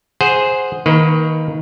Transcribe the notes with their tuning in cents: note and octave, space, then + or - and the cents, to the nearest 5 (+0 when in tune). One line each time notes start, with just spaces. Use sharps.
G#4 +0 C5 +0 F#5 +0
D#3 +20 A#3 +0 B4 +0